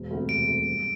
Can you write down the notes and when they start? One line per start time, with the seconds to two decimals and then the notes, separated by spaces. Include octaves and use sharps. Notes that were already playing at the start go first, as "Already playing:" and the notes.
Already playing: E1
0.11 D2 C3
0.29 E1 D7
0.48 D2 C3
0.66 G2